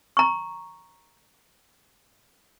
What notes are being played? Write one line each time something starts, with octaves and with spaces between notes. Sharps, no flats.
A#5 C#6